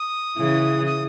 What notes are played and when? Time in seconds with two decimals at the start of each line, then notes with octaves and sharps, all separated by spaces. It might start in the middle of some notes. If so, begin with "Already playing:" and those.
Already playing: D#6
0.38 C#3 E3
0.87 D#6